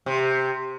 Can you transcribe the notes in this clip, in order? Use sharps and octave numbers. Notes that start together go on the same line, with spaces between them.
C3